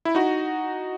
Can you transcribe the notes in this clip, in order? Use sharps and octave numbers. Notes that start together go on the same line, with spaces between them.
E4
D#4 F#4